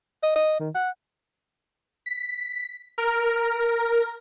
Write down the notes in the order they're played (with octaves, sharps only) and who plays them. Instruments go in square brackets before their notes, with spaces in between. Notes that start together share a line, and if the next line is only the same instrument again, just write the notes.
[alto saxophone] D#5
D#5
D#3
F#5
[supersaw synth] B6
A#4